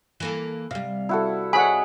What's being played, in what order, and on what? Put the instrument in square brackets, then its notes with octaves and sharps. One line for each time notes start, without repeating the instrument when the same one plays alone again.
[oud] E3 A#3 A4
[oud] C3 G3 [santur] F5
[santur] E4 F#4 A4
[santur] G#4 C#5 D#5 [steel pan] F#5 B5 [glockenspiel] G#5